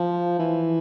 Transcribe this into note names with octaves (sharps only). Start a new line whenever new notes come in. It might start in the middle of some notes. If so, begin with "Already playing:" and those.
Already playing: F3
E3